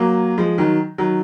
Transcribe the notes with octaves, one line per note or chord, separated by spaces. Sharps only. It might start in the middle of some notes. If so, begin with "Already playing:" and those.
Already playing: F#3 A#3
F3 G#3
D#3 F#3
D#3 F#3